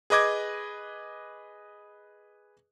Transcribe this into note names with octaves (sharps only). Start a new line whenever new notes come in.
G#4 B4 D#5 D6 G#6